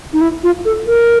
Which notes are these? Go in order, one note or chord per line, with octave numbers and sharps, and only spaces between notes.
D#4
E4
F4
A4
A#4